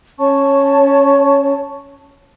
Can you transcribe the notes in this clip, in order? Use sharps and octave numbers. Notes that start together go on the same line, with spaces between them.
C#4 C#5 A5 C#6